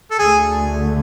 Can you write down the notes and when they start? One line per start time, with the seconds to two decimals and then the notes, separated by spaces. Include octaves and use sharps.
0.11 A4
0.19 D2 D3 A3 G#4